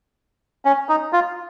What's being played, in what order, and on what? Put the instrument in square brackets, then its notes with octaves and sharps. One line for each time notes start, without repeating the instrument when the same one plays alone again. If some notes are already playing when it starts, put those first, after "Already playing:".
[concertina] C#4
D#4
F4